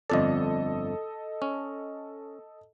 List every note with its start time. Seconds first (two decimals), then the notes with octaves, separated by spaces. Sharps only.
0.10 G1 F2 A4 D5 D#5
1.42 C#4